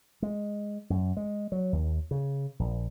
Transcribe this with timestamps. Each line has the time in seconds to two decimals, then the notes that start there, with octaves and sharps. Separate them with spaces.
0.22 G#3
0.90 F#2
1.17 G#3
1.52 F#3
1.73 D#2
2.11 C#3
2.59 A#1